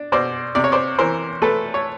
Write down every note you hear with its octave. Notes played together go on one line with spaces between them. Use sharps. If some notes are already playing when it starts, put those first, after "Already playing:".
Already playing: D4
B2 C5 D5
C3 D5
C#5
C5 D5
E3 A#4 C5
A3 A4 B4
C#5